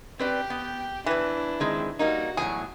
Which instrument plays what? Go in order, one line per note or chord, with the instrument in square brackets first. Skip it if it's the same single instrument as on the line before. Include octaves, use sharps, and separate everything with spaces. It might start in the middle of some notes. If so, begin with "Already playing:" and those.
[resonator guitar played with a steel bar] C4 B4 D5 [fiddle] G4 G5
[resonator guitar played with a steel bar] B3
[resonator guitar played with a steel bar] E2 B4 [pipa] E3 [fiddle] D4 E4
[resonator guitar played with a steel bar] D#3 G#3 C4
[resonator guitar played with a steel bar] G3 A#3 D#4 [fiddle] F#4
[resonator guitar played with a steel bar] E2 A2 F#3 [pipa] G#4